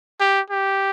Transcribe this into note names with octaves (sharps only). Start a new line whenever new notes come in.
G4
G4